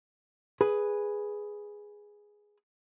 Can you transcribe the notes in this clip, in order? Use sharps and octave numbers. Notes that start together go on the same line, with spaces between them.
G#4 B4